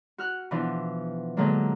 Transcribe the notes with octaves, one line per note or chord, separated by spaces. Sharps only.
F#4 F6 F#6
B2 E3 F3 D4 E4
A#2 D3 F#3 G#3 A#3 D4